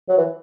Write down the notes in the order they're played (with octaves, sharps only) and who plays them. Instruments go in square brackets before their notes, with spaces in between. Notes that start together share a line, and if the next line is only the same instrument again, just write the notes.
[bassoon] F#3
E3